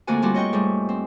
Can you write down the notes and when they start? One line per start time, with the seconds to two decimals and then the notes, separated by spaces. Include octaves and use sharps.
0.07 F2 D3 A3 A#3 F#4 G#5
0.22 G3 C4 D4 F4 F#4
0.34 C#5 D#5 G5 C#6
0.53 G#2 G3 A3
0.89 C4